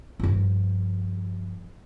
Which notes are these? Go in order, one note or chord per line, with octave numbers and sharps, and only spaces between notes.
G2 F3